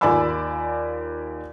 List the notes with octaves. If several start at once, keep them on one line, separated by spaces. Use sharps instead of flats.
D#2 F4 D5 G#5 B5 E6